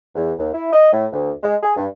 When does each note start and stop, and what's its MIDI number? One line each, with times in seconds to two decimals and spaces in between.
0.16 0.32 40
0.38 0.51 39
0.53 0.70 64
0.73 0.92 75
0.93 1.06 45
1.13 1.31 38
1.43 1.55 56
1.62 1.73 68
1.76 1.86 43